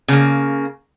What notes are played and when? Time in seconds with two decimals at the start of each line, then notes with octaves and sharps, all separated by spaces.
0.08 C#3 A#3